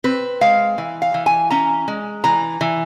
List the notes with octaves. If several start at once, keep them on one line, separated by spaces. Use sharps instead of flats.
C4 B4
G#3 F5
E3
F5
E3
G#5
C#4 A#5
G#3
E3 A#5
E3